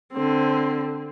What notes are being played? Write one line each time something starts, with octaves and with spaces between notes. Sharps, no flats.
D3 C4